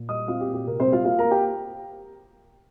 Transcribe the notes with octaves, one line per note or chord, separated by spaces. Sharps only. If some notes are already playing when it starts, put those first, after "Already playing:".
Already playing: A#2
G3 D#5 D#6
C4 F4 F5
G4
A#2
G4
C3 A#4
C4 C5
G3
F4 F5
A#3 F4 F5
A#4 A#5
A#3
G4 G5